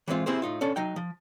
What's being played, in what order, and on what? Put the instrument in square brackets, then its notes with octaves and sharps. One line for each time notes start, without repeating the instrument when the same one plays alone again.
[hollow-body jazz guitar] E3 G3 G#3 C4 F4
C4 E4 G4 G#4 C5
A2 D#4 F4
C#4 D4 A4
F#3 D#4 G5
F3